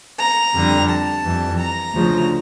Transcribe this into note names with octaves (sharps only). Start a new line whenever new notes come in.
A#5
F2 D3 G3
A5
F2 E3 G3
A#5
D2 C#3 F3